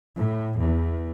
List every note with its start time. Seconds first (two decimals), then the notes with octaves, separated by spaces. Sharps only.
0.16 A2
0.59 E2